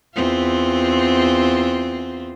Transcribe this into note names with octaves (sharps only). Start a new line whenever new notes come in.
E2 C4 F4